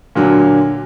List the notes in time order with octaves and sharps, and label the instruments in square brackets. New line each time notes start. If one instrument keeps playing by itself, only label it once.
[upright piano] A#2 D3 F#3